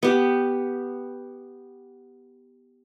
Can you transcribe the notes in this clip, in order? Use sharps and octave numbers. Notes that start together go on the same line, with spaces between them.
B3 G4